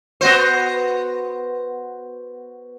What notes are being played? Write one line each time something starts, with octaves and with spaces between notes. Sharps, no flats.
B3 F#4 C5